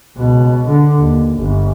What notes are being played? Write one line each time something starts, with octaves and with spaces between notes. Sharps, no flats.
C#2 B2
D3
D#2
G1